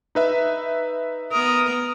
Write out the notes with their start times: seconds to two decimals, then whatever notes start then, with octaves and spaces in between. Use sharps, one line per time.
0.15 D#4 B4 E5
1.32 B3 A#4 D#6